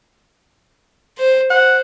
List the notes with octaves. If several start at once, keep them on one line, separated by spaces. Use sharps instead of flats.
C5
C5 F#5